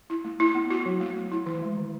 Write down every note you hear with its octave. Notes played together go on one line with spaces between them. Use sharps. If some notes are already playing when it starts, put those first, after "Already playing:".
E4
A3
E4
B3
F#4
F#3
A3
A3
E4
E3
G#3
D#3